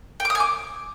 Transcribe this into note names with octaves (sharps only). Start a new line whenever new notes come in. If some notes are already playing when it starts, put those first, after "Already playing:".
G5
D6
D#6
G#5
D6